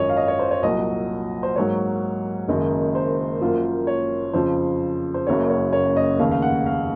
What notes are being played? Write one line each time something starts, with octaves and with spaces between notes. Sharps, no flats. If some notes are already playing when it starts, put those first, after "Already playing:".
Already playing: G#1 F#2 F3 C#5 D#5
F5
D#5
C#5
C5
C#5
C2 A#2 F#3 D#5
C5
G#2 F#3 A#3 C#5
F#1 F#2 D#3 G#3 D#4
C5
F#2 F3 A#3 F4
C#5
F2 C#3 F3 C5
C5
F#1 F#2 C#3 F#3 A#3 C#5
C#5
C#5
D#5
F1 D#2 C#3 F5
F5
F#5
F5